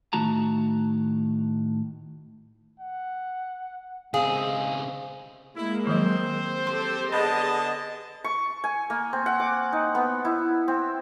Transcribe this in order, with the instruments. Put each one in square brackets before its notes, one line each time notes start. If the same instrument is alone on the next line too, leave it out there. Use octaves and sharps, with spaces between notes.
[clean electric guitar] A2 D#3 A3 F#4 A5 A#5
[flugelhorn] F#5
[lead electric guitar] C#3 C4 [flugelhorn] G#3 [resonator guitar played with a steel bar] G#4 [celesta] F5
[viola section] G#3 A#3 [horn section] E4
[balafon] D#3 F3 F#3 [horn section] C4 C5
[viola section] G4 A4 [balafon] C6
[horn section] D3 B3 A5 [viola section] G#4 D#5 [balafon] B5
[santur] C#6
G#5
A#3
C4
F#5
D6
D#4
B3
E4
C4